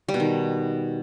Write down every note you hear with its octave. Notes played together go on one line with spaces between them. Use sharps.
G3
B2
D#3